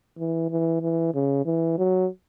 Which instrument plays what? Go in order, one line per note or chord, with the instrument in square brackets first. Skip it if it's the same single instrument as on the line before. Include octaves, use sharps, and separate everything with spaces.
[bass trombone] E3
E3
E3
C#3
E3
F#3